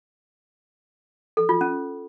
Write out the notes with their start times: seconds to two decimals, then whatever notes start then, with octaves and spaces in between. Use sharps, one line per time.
1.37 A4
1.49 F4
1.61 C#4